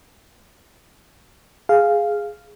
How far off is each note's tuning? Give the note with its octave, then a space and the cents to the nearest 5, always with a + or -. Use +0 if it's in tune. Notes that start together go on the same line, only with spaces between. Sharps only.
G#4 +0 F5 -5